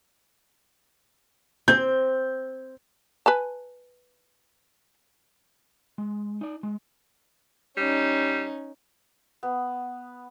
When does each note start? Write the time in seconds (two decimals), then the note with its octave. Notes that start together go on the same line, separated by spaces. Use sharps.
1.68 C4 G6
3.26 B4 G#5 A5
5.98 G#3
6.41 D#4 D5
6.63 G#3
7.77 G3 C#4 D#4
9.43 B3